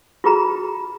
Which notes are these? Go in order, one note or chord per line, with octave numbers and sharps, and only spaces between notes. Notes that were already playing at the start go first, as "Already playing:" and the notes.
F4 F#4 G#4 A#5 B5